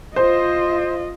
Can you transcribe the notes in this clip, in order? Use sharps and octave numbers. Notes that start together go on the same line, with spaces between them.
F4 C5 D#5